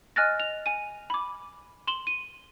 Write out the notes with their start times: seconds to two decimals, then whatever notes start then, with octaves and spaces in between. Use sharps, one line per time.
0.16 D#5 G#5 F6 F#6 A6 A#6
0.40 F7
0.66 G#5 D#7
1.10 B5 D6
1.87 C6 E7 F#7 G7
2.07 D#7